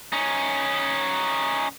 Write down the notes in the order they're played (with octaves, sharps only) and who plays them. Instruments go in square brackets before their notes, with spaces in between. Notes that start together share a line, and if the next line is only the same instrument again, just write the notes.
[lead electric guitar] C#4 D#4